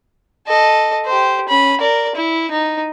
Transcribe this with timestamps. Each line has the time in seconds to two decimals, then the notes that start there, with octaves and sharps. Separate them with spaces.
0.48 A4 D#5
1.06 G4 C5
1.49 C#4 B5
1.81 A#4 D5
2.15 E4
2.51 D#4